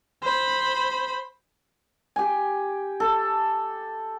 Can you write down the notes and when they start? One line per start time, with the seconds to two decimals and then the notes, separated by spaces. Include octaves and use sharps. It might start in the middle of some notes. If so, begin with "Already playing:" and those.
0.22 C5 B5
2.16 G4 G#5
3.00 A4